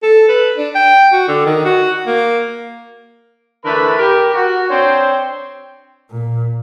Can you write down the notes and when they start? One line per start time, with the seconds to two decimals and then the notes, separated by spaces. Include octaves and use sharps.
0.03 A4
0.28 B4
0.57 D4
0.75 G5
1.13 F#4
1.28 D3
1.46 D#3
1.65 F#4
2.07 A#3
3.64 D3 E3 A3 A#4 B4 B5
3.98 G4 A#4
4.35 F#4
4.70 C4 D4 C5 C#5 G5
6.11 A#2